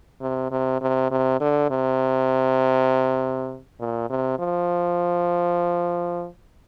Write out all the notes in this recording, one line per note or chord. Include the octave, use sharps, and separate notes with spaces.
C3
C3
C3
C3
D3
C3
A#2
C3
F3